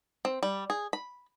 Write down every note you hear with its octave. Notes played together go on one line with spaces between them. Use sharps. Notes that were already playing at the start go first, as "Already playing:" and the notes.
C4
G3
G#4
B5